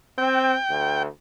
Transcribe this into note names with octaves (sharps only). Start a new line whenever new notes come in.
C4 G5
D2